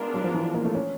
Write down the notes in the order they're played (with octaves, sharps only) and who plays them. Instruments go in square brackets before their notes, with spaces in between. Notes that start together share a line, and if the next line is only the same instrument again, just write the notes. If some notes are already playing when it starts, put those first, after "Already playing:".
Already playing: [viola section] G#3 B3 D4 F4 A#4
[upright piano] F#3
F3
E3
A#3
A3
C#4